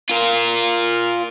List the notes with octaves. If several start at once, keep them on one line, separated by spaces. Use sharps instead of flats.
F4 A#4